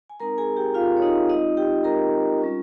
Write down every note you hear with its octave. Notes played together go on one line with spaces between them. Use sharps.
G#5
G#3 C4 D#4 A#4 A#5
G#4 G#5
G4 G5
G#3 C4 D#4 F4 F5
C#5
D#4 D#5
G#3 C4 D#4 F4 D#5
G4 G5
G#3 C4 F4 A#4 A#5
G3 C#4 F4